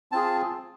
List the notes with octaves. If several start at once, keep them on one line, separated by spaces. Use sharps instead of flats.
C4 F4 G#4 A5